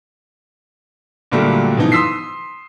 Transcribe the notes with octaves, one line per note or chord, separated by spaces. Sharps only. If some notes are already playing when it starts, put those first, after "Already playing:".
A#2 D3 F#3 G3 A3 A#3
B2 E3 F3 D#4
C6 D#6 E6 B6 C7